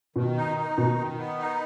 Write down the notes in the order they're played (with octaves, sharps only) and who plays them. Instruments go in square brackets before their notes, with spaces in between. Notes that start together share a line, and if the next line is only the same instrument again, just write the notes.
[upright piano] B2 [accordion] D#3
[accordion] D#4
D#4
[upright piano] B2 [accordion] D#3
[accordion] D#3
B3
D#4